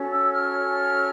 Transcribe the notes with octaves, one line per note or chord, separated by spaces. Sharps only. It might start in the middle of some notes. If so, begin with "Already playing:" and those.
Already playing: C#4 F#4 A4 C#5
E6
F6